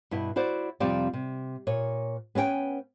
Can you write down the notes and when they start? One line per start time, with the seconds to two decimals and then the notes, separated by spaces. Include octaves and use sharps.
0.11 G2 B2 E4
0.36 E4 F#4 C5 D5
0.80 F2 C3 F3 G3 C4 D5
1.14 C3
1.67 A#2 C#5
2.35 B3 C#4 A#4 G5 G#5